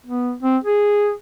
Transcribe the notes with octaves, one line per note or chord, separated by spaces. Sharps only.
B3
C4
G#4